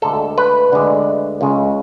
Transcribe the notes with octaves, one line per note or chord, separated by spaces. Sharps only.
D2 D3 G#3 A4
B4
D2 D3 G#3
C#2 C#3 G#3